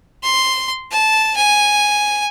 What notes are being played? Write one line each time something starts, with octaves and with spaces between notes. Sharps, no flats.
C6
A5
G#5